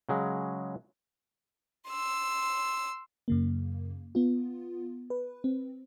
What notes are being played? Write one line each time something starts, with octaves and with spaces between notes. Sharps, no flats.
C#3 F#3 G#3
C6 E6
F#2 C#3 A#3
B3 F4
B4
C4